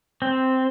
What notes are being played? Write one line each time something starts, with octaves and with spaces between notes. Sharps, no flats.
C4